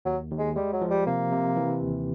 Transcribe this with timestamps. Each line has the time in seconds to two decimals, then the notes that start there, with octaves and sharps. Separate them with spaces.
0.05 D#2 F#3
0.31 D#2
0.39 G#3
0.56 G3 G#3
0.72 F#3
0.81 F3
0.90 G3
1.06 C3 A#3
1.32 C3
1.56 E3
1.81 D#2